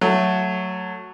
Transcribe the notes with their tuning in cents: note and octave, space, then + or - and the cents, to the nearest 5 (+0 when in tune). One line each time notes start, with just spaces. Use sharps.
F#3 +0 A3 +10